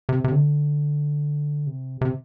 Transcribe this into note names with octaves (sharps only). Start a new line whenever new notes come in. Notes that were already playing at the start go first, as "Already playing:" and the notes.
C3
C3
D3
C3
C3